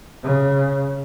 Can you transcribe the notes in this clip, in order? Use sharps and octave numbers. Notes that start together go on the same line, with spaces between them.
C#3